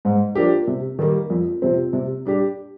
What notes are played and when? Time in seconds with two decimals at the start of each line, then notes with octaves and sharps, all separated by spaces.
0.05 G#2
0.35 F3 A#3 D4 G4
0.67 C3
0.99 D#3 G3 A#3
1.30 F2
1.62 C3 F3 C4
1.93 C3
2.25 G3 D4 G4